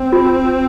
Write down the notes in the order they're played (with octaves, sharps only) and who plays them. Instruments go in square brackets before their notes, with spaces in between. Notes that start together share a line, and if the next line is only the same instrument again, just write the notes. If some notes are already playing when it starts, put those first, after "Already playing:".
Already playing: [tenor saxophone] C4
[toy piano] F4